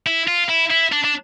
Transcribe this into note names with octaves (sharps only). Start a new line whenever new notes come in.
E4
F4
E4
E4
D4
D4